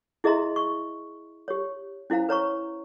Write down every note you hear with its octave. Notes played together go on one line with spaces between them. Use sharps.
E4 G#4 D#5 E5 A#5 C6
C#6
G4 C#5
C#4 E4 C5 F5 A#5
B4 C#5 A#5 C#6